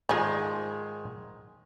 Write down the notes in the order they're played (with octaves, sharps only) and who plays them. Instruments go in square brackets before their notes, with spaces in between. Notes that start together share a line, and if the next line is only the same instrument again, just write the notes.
[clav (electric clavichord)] G#2 D#3 G#3 [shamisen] F3 G#4